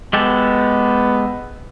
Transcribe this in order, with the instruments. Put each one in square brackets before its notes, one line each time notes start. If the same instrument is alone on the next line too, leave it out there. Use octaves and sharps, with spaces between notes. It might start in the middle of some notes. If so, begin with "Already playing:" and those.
[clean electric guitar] G#3 G4 A4 [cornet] B3